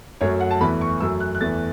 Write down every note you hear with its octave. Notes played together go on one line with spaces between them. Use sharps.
F#2 F#3 A3 C#5
F#5
A5
E2 E3 A3 B5
C#6
F#2 F#3 A3 E6
F#6
F#6
E2 E3 A3 A6